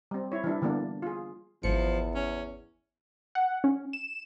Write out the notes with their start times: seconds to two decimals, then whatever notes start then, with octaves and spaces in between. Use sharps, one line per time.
0.11 G3 C4
0.32 E4 C#5
0.44 E3 G3 D4 E4
0.62 D3 E3 G3 A#3 B3 D4
1.02 F4 G#4
1.63 G#1 E2 F3 C#7
2.15 C#4
3.35 F#5
3.64 C#4
3.93 E7